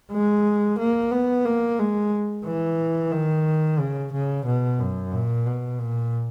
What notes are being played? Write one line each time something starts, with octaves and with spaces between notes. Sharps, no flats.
G#3
A#3
B3
A#3
G#3
E3
D#3
C#3
C#3
B2
F#2
A#2
B2
A#2